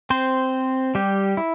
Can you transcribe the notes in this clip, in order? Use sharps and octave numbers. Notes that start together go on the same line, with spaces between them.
C4 C5
G3 G4
E4